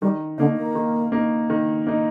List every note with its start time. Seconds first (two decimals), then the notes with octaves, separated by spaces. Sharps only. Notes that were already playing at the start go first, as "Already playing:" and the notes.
0.02 D#3 G3
0.38 D3 A#3 D#4
0.57 A#3
0.75 D#3
1.12 A#3 D#4
1.50 D#3
1.87 A#3 D#4